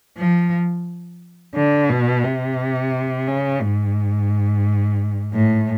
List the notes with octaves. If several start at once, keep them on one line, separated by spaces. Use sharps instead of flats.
F3
D3
B2
C3
C#3
G#2
A2